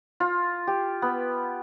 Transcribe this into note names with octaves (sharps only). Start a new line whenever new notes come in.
F4
G4
B3